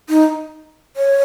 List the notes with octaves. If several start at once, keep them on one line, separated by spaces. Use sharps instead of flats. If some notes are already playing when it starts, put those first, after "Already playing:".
D#4
C#5